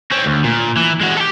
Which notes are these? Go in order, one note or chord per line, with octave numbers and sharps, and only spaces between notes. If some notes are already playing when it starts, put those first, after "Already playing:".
C4 C#4
D2
A#2
E3
G#3 F#4
G4 A4